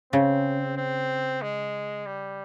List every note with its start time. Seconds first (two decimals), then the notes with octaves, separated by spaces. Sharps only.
0.13 C#3 C4
0.77 C4
1.42 G#3
2.06 G3